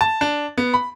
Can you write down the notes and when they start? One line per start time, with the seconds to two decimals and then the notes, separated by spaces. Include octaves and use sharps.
0.01 A5
0.21 D4
0.58 B3
0.74 B5